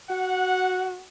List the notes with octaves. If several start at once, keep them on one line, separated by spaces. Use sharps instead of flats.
F#4 F#5